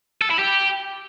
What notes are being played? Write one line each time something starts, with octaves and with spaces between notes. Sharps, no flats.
A4
E4
G4